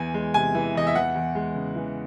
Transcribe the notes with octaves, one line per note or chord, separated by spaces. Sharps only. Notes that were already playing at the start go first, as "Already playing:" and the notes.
Already playing: E2 E3 G#5
G#3
C3 G#5
E3
E2 D#5
E5
E3 F#5
E2
G#3
C#3
E3